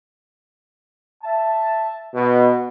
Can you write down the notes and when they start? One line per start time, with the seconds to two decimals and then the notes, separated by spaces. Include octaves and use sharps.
1.23 E5 A5
2.15 B2